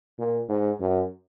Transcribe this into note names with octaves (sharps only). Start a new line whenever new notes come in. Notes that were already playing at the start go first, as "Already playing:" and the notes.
A#2
G#2
F#2